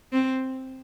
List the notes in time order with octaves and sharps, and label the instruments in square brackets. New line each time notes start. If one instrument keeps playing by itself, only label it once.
[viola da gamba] C4